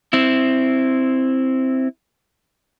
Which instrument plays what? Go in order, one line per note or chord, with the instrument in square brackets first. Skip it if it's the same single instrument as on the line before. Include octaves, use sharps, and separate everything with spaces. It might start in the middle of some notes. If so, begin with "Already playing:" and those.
[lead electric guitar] C4 E4